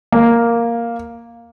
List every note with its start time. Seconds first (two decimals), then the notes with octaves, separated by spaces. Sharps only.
0.12 A#3